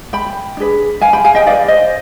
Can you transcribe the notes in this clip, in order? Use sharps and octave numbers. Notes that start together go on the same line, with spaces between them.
G5 B5
D4 G#4 B4
F5 G#5
G5 B5
F5 G#5
D#5 G5
D#4 B4 D5 F5
C5 D#5